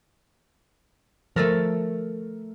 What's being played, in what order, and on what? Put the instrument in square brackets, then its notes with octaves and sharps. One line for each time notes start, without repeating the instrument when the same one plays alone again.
[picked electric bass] F3 [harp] A3 A4 A#4